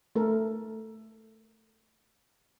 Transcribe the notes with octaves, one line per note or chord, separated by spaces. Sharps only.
A3 A4 A#4